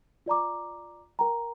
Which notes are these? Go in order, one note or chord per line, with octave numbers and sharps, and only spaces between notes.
F4 D5 A#5 D6
A#4 G5 A#5